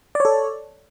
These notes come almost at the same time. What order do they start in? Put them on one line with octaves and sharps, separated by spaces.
D5 C#5 A4